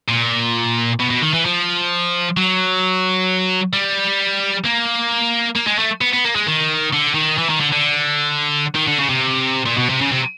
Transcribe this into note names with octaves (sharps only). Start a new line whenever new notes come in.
A#2
B2
B2
D#3
E3
F3
F#3
G3
A#3
A#3
G#3
A3
B3
B3
A#3
G#3
D#3
D3
D#3
E3
D#3
D3
D3
D#3
D3
C#3
C3
A#2
B2
C3
C#3
C3